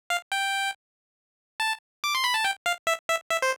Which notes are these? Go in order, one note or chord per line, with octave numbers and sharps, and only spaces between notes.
F5
G5
A5
D6
C6
B5
A5
G5
F5
E5
E5
E5
C5